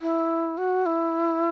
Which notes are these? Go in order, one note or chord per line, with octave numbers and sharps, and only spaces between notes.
E4
F#4
E4